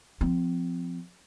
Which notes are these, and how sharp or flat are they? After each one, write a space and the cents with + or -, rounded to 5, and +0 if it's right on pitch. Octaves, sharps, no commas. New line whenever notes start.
F3 +0 C4 -25